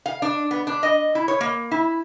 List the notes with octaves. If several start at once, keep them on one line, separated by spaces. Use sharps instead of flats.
F5
D4
B3
D4
D#5
E4
C#5
A#3
E4